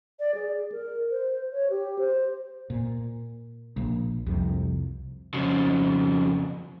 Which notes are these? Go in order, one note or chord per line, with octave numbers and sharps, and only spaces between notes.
D5
G#4
A#4
C5
C#5
G4
C5
A#2
A#1 A#3
C2 F2 C3
F2 C#3